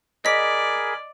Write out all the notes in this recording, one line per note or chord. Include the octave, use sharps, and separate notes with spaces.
G#4 A#4 D5 D#5 B5 B6